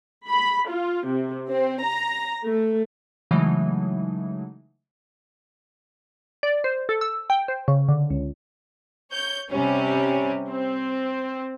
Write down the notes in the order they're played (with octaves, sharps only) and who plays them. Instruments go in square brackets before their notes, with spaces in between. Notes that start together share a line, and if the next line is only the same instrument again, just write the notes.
[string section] B5
F4
C3
C4
A#5
A3
[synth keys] C#3 E3 F#3 G#3 A3 D#4
[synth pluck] D5
C5
A4
E6
G5
C5
C#3
D3
C#2
[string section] C#5 G6
C3 G3 C#4
C4